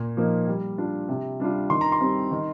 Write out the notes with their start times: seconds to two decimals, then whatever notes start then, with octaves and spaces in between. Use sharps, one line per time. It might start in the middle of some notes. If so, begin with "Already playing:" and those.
Already playing: A#2
0.17 F3 A#3 D#4
0.47 G3
0.78 D4 F4
1.09 C3
1.40 G3 D4 F4
1.70 D#3 C6
1.81 A#5
1.92 C6
2.01 G3 C4
2.31 D#3